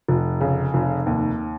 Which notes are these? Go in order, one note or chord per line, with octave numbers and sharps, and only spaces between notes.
F1
C#3
F1
D#2